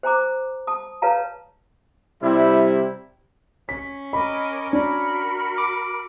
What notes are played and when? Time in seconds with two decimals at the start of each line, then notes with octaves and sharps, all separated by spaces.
0.03 C5 G#5 A#5 D6
0.67 A5 D#6
1.02 B4 C#5 D5 F5 A5 A#5
2.22 C3 G3 E4
3.69 C#4 B6
4.13 A#4 D#5 B5 D6
4.73 D4 F#4 A#4 B5
5.58 D6